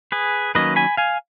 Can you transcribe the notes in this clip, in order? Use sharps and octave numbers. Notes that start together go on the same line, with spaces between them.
G#4 B4
D#3 F#3 A#3 C#4 B4 D#5
G#5 B5
F5 G#5